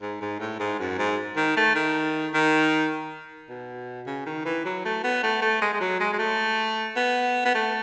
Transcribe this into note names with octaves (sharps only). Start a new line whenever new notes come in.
G#2
G#2
A2
G#2
F#2
G#2
D#3
A3
D#3
D#3
B2
C#3
D#3
E3
F#3
A3
B3
A3
A3
G#3
G#3
F#3
G#3
G#3
A3
B3
B3
A3